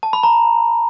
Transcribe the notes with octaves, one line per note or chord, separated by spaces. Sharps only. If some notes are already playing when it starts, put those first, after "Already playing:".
A5
B5
A#5